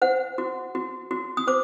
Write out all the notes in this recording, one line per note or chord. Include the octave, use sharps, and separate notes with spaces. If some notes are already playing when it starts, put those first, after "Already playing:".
C5 F#5
F#4
F#4
F#4
D#6
C5 D6